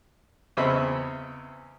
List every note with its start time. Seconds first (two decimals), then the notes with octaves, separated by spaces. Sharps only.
0.57 E2 C#3 C4 D#5 E5 B5